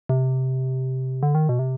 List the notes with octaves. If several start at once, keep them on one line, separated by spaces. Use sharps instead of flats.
C3
D3
D#3
B2
C3